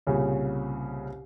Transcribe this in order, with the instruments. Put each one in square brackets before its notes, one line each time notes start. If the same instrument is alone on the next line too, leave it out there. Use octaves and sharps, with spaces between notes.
[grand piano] C2 A#2 C#3 C#4